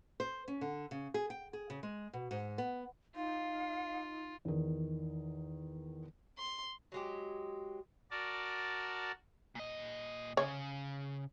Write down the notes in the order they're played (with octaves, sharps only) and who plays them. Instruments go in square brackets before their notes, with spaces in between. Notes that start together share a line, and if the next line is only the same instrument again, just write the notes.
[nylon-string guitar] C5
C#4
D3
C#3
G#4
G5
G#4
C#3
G#3
B2
G#2
B3
[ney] D#4 [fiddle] F4 [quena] F5
[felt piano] E2 D#3
[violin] C6
[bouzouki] F#3 G#3 G4
[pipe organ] F#4 A#4 D5 A5
[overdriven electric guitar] A#2 D#5
[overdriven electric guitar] C#3 [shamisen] C#5